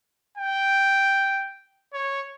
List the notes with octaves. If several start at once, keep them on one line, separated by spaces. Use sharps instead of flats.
G5
C#5